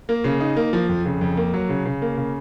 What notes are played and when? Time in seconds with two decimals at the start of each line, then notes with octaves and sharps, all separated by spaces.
0.09 A#3
0.24 C#3
0.40 D#4
0.56 A#3
0.73 F3
0.89 F2
1.06 C#3
1.21 F2
1.37 A#3
1.54 F#3
1.69 C#3
1.85 C#3
2.02 A#3
2.17 C#3